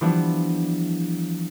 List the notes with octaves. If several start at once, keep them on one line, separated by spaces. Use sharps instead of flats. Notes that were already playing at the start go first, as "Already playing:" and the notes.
E3 F3 G3 B3 D4